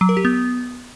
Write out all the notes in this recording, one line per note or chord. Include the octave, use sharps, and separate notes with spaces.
F#3
A#4
G4
B3